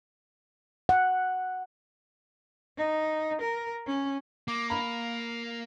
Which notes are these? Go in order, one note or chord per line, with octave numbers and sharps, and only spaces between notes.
F#5
D#4
A#4
C#4
A#3 D6
F5 A#5 B5